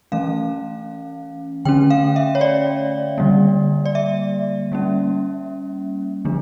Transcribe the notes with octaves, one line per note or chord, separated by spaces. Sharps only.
E3 A3 C#4 F5
D3 A3 C#4 G5
F5
E5
C#5
D5
D3 G3 A#3
D5
E5
G3 A#3 C#4
D3 F3 A3 D4